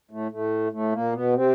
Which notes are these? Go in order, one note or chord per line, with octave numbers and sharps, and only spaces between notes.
A2 A3
A2 A3
A2 A3
A#2 A#3
B2 B3
C3 C4